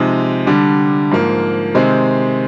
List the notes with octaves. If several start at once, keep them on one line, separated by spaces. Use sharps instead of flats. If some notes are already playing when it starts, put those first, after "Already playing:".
Already playing: C3 F3 G#3 D#4
D3 G3 D4
G#2 F3 A#3
C3 D#3 G#3 C4